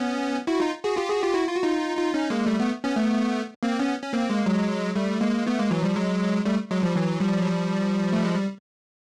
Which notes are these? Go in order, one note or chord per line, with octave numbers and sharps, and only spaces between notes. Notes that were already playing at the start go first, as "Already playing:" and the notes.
Already playing: B3 C#4
E4 F#4
D#4 F4
F#4 G#4
F4 G4
F#4 G#4
F4 G4
E4 F#4
F4
F#4
D#4 F4
D#4 F4
C#4 D#4
G#3 A#3
G3 A3
A3 B3
B3 C#4
A3 B3
A#3 C4
B3 C#4
C#4
A#3 C4
G#3 A#3
F#3 G#3
G3 A3
G#3 A#3
A3 B3
G#3 A#3
E3 F#3
F3 G3
F#3 G#3
G3 A3
F#3 G#3
F3 G3
E3 F#3
F3 G3
F#3
F3 G3
A3
G#3
G3